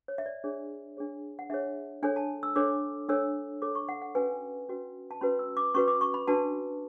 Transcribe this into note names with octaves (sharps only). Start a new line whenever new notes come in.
C#5
E5
D5
D4 G#4 C#5
D4 G#4 C#5
F#5
D4 G#4 C#5 E5
D4 A4 C#5 G#5
A5
E6
D4 A4 C#5 D6
D4 A4 C#5 E6
D4 A4 C#5 D6
C#6
F#5
F#5
C#4 F#4 B4 G#5
C#4 F#4 B4
A5
C#4 F#4 B4 B5
E6
D6
C#4 F#4 B4 C#6
D6
C#6
B5
D4 F#4 B4 A5